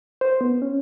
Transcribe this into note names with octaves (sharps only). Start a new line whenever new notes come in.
C5
B3
C#4